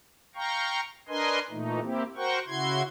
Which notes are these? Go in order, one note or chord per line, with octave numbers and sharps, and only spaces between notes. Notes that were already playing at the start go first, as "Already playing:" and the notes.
F5 G5 A#5 C#6
D4 A#4 B4 D#5 G#5 C6
A#2 E3 A3 D#4
A#3 C4 E4 G4
F#4 A#4 C5 F#5 G5 C#6
C#3 E4 F#4 C6 G#6